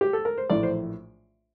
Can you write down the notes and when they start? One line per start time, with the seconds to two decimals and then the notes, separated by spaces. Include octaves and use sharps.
0.01 G4
0.13 A4
0.25 A#4
0.38 C5
0.50 A#1 A2 E3 A3 D5
0.63 C5